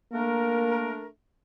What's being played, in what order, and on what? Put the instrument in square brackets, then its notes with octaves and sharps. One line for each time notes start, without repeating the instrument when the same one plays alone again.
[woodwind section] A3 D4 A#4 [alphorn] A#3